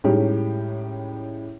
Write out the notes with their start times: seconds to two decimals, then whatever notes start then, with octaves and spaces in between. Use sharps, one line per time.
0.04 A2 G3 G#3 C#4 D#4 G4